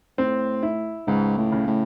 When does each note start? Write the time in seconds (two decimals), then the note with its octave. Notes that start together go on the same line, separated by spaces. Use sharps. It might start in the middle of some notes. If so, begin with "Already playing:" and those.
0.18 A2 C4
0.63 E4
1.07 C#2 G#2
1.37 A2
1.52 C#3
1.67 A2